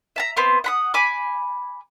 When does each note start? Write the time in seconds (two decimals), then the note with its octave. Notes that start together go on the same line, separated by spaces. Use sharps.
0.16 E5 A5 A#5
0.36 B3 C4 C6
0.64 F#5 B5 D#6
0.94 G#5 B5 D6